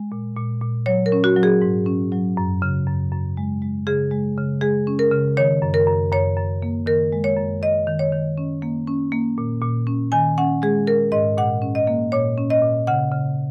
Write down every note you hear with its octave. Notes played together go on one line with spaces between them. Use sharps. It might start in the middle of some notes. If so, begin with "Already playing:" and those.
Already playing: G#3
A#2
A#2
A#2
F#3 C#5
A#4
C#4
F#4
F#3
G#4
G#2
C#4
F#3
F#2
C#3
F#2
F#2
G#3
G#3
C#3 G#4
G#3
C#3
G#3 G#4
C#4
A#4
C#3
D#3 C#5
F#2
A#4
F#2
F#2 C#5
F#2
A#3
D#3 A#4
G#3
C#5
F#2
F#2 D#5
D#3
C#5
D#3
C#4
A#3
C#4
A#3
A#2
A#2
C#4
D#3 G#5
C#4 F#5
G#3 G#4
D#3 A#4
G#2 D#5
A#2 F#5
C#4
D#5
A#3
A#2 C#5
C#4
D#5
A#2
C#3 F#5
C#3